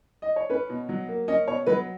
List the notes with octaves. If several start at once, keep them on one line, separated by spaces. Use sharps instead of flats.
D#5
C#5
C#4 B4
B2
F#3
A#3
C#4 D#5
B2 C#5
F#3 B4